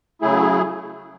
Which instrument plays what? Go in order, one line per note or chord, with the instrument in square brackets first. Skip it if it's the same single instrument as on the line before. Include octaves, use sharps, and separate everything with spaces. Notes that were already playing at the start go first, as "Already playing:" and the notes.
[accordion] C#3 F#3 A3 E4 G#4